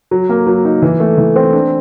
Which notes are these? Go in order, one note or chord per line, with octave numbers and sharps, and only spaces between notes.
F#3
A#3
F#3
D#4
E3
A3
E3
C4
D4